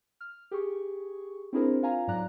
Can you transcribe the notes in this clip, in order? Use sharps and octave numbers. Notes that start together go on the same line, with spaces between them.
F6
G4 G#4 C#6
C4 D4 E4 G#4 A#4 C5
F4 F5 G#5 A#5
G#2 F#3 D5 A#5 F#6